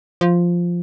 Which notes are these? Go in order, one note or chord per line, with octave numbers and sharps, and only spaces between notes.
F3